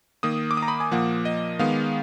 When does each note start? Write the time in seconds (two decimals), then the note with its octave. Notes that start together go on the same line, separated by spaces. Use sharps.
0.23 D#3 A#3 D#6
0.51 D6
0.57 D#6
0.62 A#5
0.68 B5
0.80 G#5
0.91 A#2 F3 A#3 F#5
1.25 D#5
1.59 D#3 G#3 B3 F5